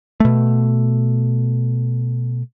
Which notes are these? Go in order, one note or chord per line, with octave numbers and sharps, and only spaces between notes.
B2 A3